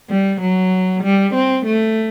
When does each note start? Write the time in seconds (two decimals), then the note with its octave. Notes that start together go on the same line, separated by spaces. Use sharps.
0.10 G3
0.41 F#3
1.04 G3
1.35 C4
1.66 A3